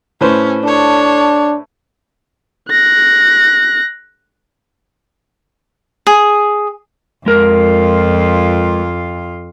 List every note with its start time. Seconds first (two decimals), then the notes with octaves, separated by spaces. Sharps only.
0.21 A2 C#4 B4 C5
0.64 D4 A4 C#5
2.70 F#6 A#6
6.07 G#4
7.26 F2 G#3 F4 A#4